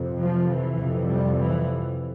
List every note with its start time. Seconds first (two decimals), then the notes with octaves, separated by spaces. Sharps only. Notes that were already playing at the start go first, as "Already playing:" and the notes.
Already playing: F2 C3
0.19 F3
0.49 E3
0.78 F2 C3
1.08 G3
1.37 E3